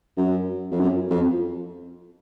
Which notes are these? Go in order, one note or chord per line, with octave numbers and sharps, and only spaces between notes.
F#2
F2
F#2
F2